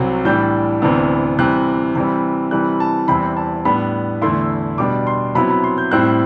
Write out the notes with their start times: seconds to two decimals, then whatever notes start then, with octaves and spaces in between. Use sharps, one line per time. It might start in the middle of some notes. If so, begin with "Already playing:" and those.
Already playing: C2 C3 F#3 C4
0.25 A2 E3 G3 D4 G6
0.82 D2 C3 E3 B3 D4
1.39 C3 E3 G3 F#6
1.96 C3 E3 G3
2.51 C3 E3 G3 F#6
2.80 A5
3.08 E2 C3 G3 C4 E4 B5
3.37 A5
3.65 A2 G3 B3 D4 B5
4.22 E2 D3 A3 E4 C6
4.78 B2 G3 D4 D6
5.07 C6
5.35 C3 F#3 B3 E4 B5
5.50 B5
5.64 C6
5.78 G6
5.91 A2 G3 C4 E4 F#6